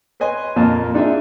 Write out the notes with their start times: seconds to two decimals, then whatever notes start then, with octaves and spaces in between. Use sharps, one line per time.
0.20 B4 C#5 D#5 G#5 C6
0.56 F2 A#2 A#3 F4 A5
0.94 D4 D#4 F4 G#4 E5